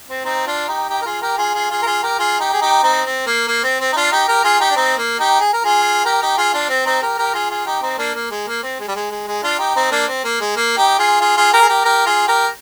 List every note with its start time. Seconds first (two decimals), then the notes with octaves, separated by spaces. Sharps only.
0.10 C4
0.25 C4 D#4
0.47 D4 F4
0.68 D#4 G4
0.89 D#4 G4
1.02 A#4
1.06 F4 G#4
1.22 G4 A#4
1.38 F4 G#4
1.54 F4 G#4
1.70 F4 G#4
1.82 A#4
1.86 F4 G#4
2.03 G4 A#4
2.19 F4 G#4
2.40 D#4 G4
2.53 G#4
2.61 D#4 G4
2.83 C4 D#4
3.05 C4
3.26 A#3
3.48 A#3
3.63 C4
3.80 C4
3.92 D#4
3.96 D4 F4
4.12 D#4 G4
4.28 G4 A#4
4.44 F4 G#4
4.60 D#4 G4
4.70 D4
4.76 C4 D#4
4.98 A#3
5.19 D#4 G4
5.41 G#4
5.53 A#4
5.64 F4 G#4
6.05 G4 A#4
6.21 D#4 G4
6.38 F4 G#4
6.53 D4 F4
6.69 C4
6.86 C4 D#4
7.02 G4 A#4
7.18 G4 A#4
7.34 F4 G#4
7.50 F4 G#4
7.66 D#4 G4
7.82 C4 D#4
7.98 A#3 D4
8.15 A#3
8.31 G#3
8.47 A#3
8.63 C4
8.79 G#3
8.88 G3
8.95 G#3
9.11 G#3
9.28 G#3
9.43 D4 F4
9.59 D#4 G4
9.75 C4 D#4
9.91 A#3 D4
10.08 C4
10.24 A#3
10.41 G#3
10.56 A#3
10.77 D#4 G4
10.99 F4 G#4
11.21 F4 G#4
11.37 F4 G#4
11.53 G4 A#4
11.61 G#4
11.68 G4 A#4
11.85 G4 A#4
12.06 F4 G#4
12.27 G4 A#4